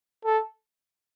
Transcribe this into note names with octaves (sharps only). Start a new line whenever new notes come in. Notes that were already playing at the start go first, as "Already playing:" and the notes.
A4